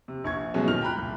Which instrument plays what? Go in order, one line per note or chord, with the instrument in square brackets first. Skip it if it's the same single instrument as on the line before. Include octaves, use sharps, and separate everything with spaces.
[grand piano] C3
A#1 C#6 G#6
B2 F#3 G#3 A3 C#4
A#2 D#3 F6 F7
G5 A#5 B5 F#6
C2 A#2